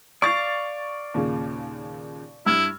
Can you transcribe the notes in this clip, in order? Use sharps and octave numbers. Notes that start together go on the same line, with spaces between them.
D5 F5 C#6 A6
D#2 A#2 C#3
G2 E4 E6 F6 G#6